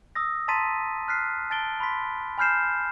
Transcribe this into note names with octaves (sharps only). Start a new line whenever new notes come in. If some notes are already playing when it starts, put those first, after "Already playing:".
D#6 E6 A#6
A5 A#5 C6 A6 B6 D#7
F6 F#6 B6 C7
A5 A6 D7 G7
B5 C6 B6
G#5 B5 F6 G6 C7 E7